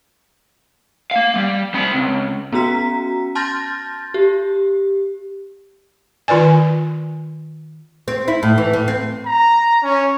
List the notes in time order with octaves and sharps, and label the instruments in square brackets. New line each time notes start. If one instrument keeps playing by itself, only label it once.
[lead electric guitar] A#3 F5
G3
C4 B5
C#2
[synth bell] B3 C#4 F#4 A#5 B6
A5 C6 F6 G6 A6 A#6
G4
[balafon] D#3 F4 B4 D5 G#5
[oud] C4
E4
A2
E3
A2
C4
[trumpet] A#5
C#4